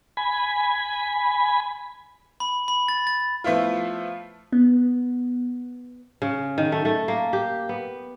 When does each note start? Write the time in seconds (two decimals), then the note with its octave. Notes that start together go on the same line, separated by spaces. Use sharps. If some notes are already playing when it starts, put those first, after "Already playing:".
0.17 G#5 B5
2.40 B5
2.68 B5
2.88 A6
3.07 A6
3.44 F3 A3 B3 E4 F4
4.52 B3
6.22 C#3
6.58 D#3
6.72 A3
6.85 A3
7.08 A#3
7.33 G4
7.69 B3